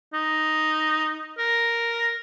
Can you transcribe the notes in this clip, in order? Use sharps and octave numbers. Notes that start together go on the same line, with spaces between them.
D#4
A#4